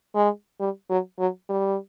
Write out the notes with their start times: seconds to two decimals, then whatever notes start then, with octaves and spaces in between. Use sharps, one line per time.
0.15 G#3
0.60 G3
0.90 F#3
1.19 F#3
1.49 G3